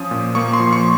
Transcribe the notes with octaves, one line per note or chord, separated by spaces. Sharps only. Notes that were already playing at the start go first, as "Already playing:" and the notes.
Already playing: F3 C#4 D#6
A#2
A#3 C#6
C6
F3
C#6